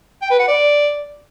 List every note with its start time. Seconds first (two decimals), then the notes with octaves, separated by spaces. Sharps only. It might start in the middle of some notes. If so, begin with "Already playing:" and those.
0.22 G5
0.30 B4
0.39 F#5
0.48 D5